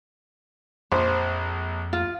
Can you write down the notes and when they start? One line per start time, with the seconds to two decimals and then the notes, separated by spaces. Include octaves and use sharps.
0.92 A#1 F2 C5
1.93 F4